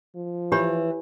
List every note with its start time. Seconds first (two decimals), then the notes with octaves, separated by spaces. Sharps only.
0.15 F3
0.52 E3 G4 C#5 B5